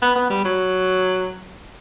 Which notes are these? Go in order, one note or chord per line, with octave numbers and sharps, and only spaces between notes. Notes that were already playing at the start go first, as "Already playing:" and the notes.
B3
B3
G3
F#3